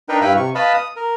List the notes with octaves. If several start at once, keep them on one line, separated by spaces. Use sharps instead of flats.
D4 D#4 A#4 B4 G5
G2 E4 B4 F5 G5 B5
C3 C#6
B4 D#5 F5 A5 B5
D#6
A#4